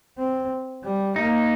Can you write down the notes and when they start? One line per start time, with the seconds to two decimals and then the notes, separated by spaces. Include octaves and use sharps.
0.17 C4
0.83 G3
1.16 A#3 D#4